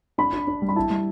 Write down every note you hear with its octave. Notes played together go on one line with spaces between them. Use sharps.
D4 B5
D4
D4
G3
B5
E4 A5
G3